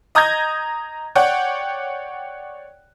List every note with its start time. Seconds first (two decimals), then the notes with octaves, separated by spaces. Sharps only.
0.15 D#5 A#5 D#6 G6 G#6 A#6
1.15 C#5 D5 F#5 G5